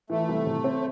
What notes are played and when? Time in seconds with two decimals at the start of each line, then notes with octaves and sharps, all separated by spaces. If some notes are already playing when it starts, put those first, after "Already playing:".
0.10 E3 A3
0.29 C2
0.46 C3
0.64 C4